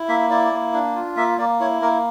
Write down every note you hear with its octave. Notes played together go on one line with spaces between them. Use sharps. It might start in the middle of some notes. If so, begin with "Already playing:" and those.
Already playing: E4
A#3 E5
E4 D5
A#3
D4
F4
A#3 E5
A#3 D5
E4 C#5
A#3 A#4